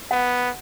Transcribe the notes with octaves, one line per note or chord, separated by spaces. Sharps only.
B3 F#5